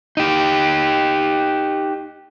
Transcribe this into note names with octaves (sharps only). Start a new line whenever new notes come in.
D#4 G4